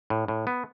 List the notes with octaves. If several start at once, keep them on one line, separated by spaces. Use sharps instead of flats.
A2
A2
B3